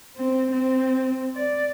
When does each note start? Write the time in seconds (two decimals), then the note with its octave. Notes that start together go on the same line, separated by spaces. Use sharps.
0.17 C4
0.51 C4
1.36 D5